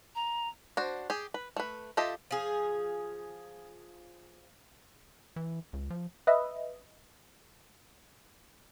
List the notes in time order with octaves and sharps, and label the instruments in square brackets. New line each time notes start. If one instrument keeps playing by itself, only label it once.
[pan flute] A#5
[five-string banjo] D4 F#4 C5
G4 G#4
B4
A3 B4
F4 G4 A4 D#5 E5
[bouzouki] F3 G#4
[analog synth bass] E3
C#2
F3
[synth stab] B4 D#5 E5